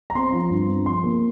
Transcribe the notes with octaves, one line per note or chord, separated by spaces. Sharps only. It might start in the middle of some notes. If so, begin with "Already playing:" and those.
A#5
C4 C6
F3
G2
C4
F3 C6
A#3